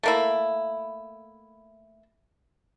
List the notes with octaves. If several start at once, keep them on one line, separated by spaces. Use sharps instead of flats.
A3 A#3 E4